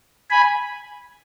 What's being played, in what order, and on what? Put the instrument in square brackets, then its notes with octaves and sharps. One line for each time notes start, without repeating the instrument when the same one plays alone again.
[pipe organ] G#5 B5